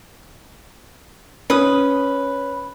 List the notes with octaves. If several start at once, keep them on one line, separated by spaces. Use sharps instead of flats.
C#4 B4 D#6